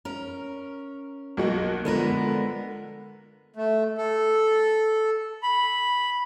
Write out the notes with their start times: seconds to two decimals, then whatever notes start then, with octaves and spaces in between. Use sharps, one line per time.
0.05 C#4 A#4
1.37 B1 A#3 F#4
1.85 D3 F3 G#3 B3 A#4
3.56 A3
3.98 A4
5.43 B5